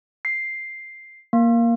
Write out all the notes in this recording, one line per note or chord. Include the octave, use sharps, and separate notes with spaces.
C7
A#3